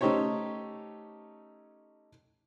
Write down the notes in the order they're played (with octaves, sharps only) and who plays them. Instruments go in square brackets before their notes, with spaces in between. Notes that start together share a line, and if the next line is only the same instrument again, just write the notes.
[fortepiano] A3 C#4 D#4 G4 C5 C#5